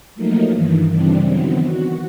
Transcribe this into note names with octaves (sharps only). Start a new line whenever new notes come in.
F3 F#3 A3 A#3 D#4 A#4
G2 D#3 E3
C#3 E3 G3 C4 D4
D#3 E3 F#3 B3 C4
F#4